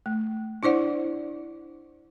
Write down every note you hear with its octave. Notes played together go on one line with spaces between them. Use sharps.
A3
D4 E4 C5 D5 F#5